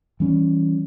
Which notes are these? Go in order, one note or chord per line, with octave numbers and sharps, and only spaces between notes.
E3 G3 C#4